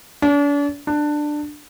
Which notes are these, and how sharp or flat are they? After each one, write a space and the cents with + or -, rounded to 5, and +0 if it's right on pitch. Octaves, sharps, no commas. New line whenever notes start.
D4 -40
D4 +15